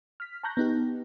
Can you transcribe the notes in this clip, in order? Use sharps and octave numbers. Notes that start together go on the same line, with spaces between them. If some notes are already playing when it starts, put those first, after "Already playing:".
F6 B6
A5 A#5 C#6 F#6 G6 A#6
B3 D#4 G4